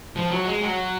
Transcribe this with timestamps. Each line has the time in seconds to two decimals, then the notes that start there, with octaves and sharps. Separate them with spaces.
0.16 F3
0.31 F#3
0.46 G#3
0.61 F#3